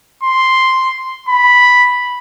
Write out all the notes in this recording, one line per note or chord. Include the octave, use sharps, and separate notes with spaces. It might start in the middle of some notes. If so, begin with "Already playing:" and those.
C6
B5